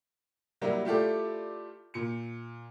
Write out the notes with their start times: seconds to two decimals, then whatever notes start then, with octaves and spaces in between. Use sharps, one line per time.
0.61 F#3 G3 A#3 D4 E4
0.85 A3 E4 F4 G4 A4 D5
1.94 A#2 C#7